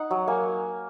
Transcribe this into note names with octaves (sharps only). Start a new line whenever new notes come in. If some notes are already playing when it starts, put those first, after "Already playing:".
Already playing: D#4 F#5
F#3
A#3 G#5